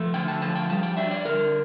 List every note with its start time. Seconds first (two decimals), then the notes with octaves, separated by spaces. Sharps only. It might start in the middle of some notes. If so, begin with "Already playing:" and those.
Already playing: F3 A3
0.14 D3 G5
0.28 A5
0.42 F3 A5
0.56 G5
0.69 G3 A5
0.83 G5
0.97 D4 E5
1.11 D5
1.25 D3 A#4